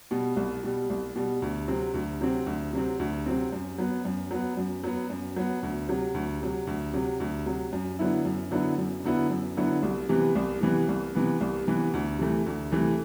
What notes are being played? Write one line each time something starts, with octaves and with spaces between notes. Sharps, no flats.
B2 G3
C2
B2 G3
C2
B2 G3
D2
C3 F#3 C4
D2
C3 F#3 C4
D2
C3 F#3 C4
D2
C3 F#3 C4
F#2
F#3 B3
F#2
F#3 B3
F#2
F#3 B3
F#2
F#3 B3
D2
C3 F#3
D2
C3 F#3
D2
C3 F#3
D2
C3 F#3
F#2
D3 F#3 B3 E4
F#2
D3 F#3 B3 E4
F#2
D3 F#3 B3 E4
F#2
D3 F#3 B3 E4
C2
C3 E3 B3
C2
C3 E3 B3
C2
C3 E3 B3
C2
C3 E3 B3
D2
C3 E3 A3
D2
C3 E3 A3